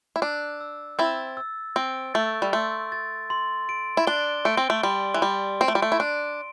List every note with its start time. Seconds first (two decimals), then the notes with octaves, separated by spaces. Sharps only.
0.16 E4
0.22 D4 E6
0.61 E6
0.99 C4 E4 A6
1.37 E6
1.76 C4 D7
2.14 A3 A6
2.42 G3
2.53 A3 C6
2.92 A6
3.30 C6
3.69 D7
3.97 E4
4.07 D4 G7
4.45 A3 D7
4.57 C4
4.70 A3
4.83 G3 C6
5.14 E3
5.22 G3 C6
5.61 C4 D7
5.68 A3
5.75 G3
5.82 A3
5.92 E4
6.00 D4 D7